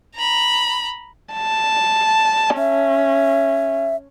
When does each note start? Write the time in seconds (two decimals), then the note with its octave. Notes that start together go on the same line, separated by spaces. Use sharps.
0.16 A#5 B5
1.33 A5
2.58 C#4 E5